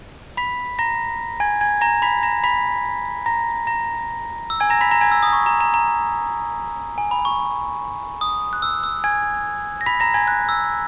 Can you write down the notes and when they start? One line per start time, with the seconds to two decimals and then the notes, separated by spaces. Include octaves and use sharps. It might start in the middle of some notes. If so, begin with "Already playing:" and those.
0.37 B5 B6
0.79 A#5 A#6
1.40 G#5 G#6
1.61 G#5 G#6
1.81 A#5 A#6
2.02 B5 B6
2.23 A#5 A#6
2.44 B5 B6
3.26 A#5 A#6
3.67 A#5 A#6
4.50 E6
4.60 G#5 G#6
4.70 A#5 A#6
4.81 B5 B6
4.91 A#5 A#6
5.01 G#5 G#6
5.12 E6
5.23 D#6
5.33 C#6
5.46 A#5
5.61 A#5
5.74 A#5
6.98 G#5
7.11 B5
7.25 C#6
8.21 D#6
8.53 F#6
8.62 E6
8.84 E6
9.04 G#5 G#6
9.81 A#6
9.86 B5 B6
10.00 A#5 A#6
10.14 G#5 G#6
10.28 F#6
10.49 E6